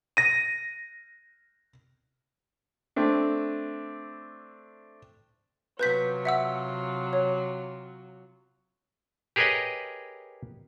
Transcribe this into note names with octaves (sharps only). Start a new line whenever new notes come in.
A#6 D#7
A3 C4 D4
C3 F#3 F4 B4 G6 B6
E5 F#5 E6
C#5
G4 G#4 A#4 B4 C#5 D#5